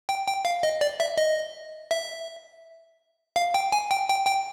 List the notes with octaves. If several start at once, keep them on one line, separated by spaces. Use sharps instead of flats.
G5
G5
F5
D#5
D5
E5
D#5
E5
F5
G5
G#5
G5
G5
G5